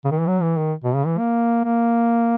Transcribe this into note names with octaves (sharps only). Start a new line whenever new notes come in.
C#3
D#3
E3
F#3
E3
D#3
B2
C#3
E3
A#3
A#3